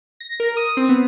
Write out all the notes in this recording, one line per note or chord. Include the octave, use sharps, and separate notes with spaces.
A#6
A#4
D#6
C4
B3